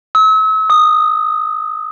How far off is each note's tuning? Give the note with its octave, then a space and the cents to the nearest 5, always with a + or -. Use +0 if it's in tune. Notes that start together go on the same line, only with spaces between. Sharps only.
E6 -40
D#6 -15